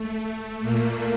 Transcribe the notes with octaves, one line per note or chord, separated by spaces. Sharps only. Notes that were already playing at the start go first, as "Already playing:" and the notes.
Already playing: A3
A#2 A#3